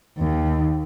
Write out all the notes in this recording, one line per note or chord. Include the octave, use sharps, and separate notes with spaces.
D#2